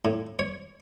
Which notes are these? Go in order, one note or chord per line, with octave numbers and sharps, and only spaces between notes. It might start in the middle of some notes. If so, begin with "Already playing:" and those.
A2
C#5